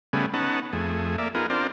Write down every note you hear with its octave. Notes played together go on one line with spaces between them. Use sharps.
C#3 G3 A3 B3 G#4
B3 C#4 D#4 F#5 A5
F2 A3 G#4
A#3 D5 E5
B3 D#4 F4 G#4 A#4
C4 D4 F4 A#4 C5 D5